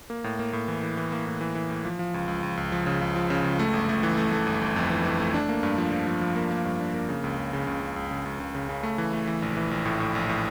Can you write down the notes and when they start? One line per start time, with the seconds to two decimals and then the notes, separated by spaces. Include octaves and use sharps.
0.10 A#3
0.24 A2
0.39 A#3
0.53 A2
0.68 E3
0.83 E3
0.97 E3
1.12 A#3
1.26 A2
1.41 E3
1.55 E3
1.70 A2
1.85 F3
1.99 F3
2.14 C#2
2.28 C#2
2.43 C#2
2.57 C#2
2.72 F3
2.86 C#3
3.01 C#2
3.16 F3
3.30 C#3
3.44 C#2
3.59 A3
3.74 G1
3.89 A3
4.03 E3
4.17 A3
4.32 A3
4.47 G1
4.61 G1
4.76 F2
4.90 E3
5.05 E3
5.20 A3
5.34 D4
5.49 A#3
5.63 G2
5.78 F3
5.93 F3
6.07 F3
6.21 F3
6.36 A#3
6.51 A#3
6.65 G2
6.80 D4
6.94 A#3
7.09 C#3
7.24 C#2
7.38 C#3
7.53 C#3
7.67 C#2
7.82 C#3
7.96 C#2
8.11 C#3
8.26 C#2
8.40 C#2
8.55 C#3
8.69 C#3
8.83 A3
8.98 E3
9.13 A3
9.27 E3
9.42 A#1
9.57 E3
9.71 A#1
9.85 A2
10.00 A2
10.15 A#1
10.29 A2